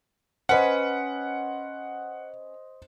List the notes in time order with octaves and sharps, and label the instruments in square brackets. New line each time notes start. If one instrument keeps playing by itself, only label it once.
[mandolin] C#4 B4 [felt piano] C5 D#5 [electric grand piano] F#5